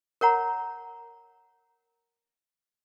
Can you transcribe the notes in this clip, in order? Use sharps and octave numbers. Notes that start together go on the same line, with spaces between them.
A#4 C#5 F#5 A#5